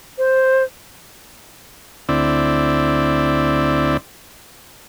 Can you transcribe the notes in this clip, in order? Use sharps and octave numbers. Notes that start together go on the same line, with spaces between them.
C5
D2 C4 E4 D5